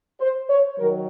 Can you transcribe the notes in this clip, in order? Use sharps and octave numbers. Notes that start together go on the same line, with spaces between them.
C5
C#5
D#3 F#3 A#4